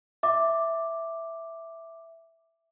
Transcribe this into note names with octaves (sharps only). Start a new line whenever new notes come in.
E5 D6